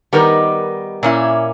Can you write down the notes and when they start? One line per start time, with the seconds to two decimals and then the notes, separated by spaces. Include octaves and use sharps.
0.13 D#3 G3 B3 D#4 A#4
1.03 A#2 A#3 C#4 E4